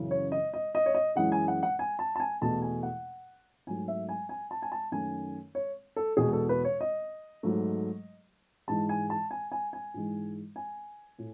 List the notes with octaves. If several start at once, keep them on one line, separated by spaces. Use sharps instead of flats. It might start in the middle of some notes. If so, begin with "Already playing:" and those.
Already playing: F#2 C#3 E3
C#5
D#5
D#5
D#5
C#5
D#5
F#2 E3 G#3 F#5
G#5
F#5
F#5
G#5
A5
A5
G#5
E2 B2 A3 A5
G#5
F#5
G#2 F#3 A3 G#5
E5
G#5
G#5
A5
G#5
A5
F#2 D#3 A3 G#5
C#5
A4
E2 B2 G#3 G#4
A4
B4
C#5
D#5
G#2 F#3 A3
G#2 E3 G#3 A5
G#5
A5
G#5
G#5
G#5
G#2 E3 G#3
G#5
A2